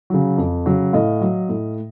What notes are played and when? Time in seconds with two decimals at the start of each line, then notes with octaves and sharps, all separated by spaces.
0.10 C#3 F#3
0.38 F2
0.66 C#3 F#3
0.93 A2 D#5 F5
1.21 F#3
1.49 A2